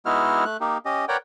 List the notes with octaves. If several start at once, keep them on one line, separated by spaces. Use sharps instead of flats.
G#3 B3 D#4 E4 F#4 F6
A3 F#6
A#3 D#4 G4
C#4 G4 D#5
A#4 B4 C#5 D5 F#5 G5